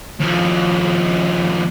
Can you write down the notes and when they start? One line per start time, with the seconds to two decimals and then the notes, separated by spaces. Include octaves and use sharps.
0.20 D#2 F3